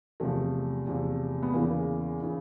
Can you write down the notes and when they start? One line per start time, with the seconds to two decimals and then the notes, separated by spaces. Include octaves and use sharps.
0.20 E2 C3 F3 A3
0.87 E2 C3 F3
1.43 B3
1.53 E2 C#3 E3 A#3
2.22 C#3 E3